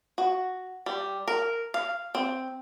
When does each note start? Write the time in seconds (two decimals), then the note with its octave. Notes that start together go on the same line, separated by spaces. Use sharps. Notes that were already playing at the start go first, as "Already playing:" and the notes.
0.18 F#4
0.86 G3
1.28 A#4
1.74 F5
2.15 C4